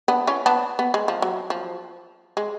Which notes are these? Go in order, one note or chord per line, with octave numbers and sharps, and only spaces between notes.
B3 D4
C#4 F4
B3 D4
B3
G#3
F3
F#3
F3
G#3